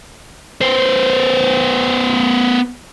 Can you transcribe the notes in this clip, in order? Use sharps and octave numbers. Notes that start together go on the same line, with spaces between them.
B3 C5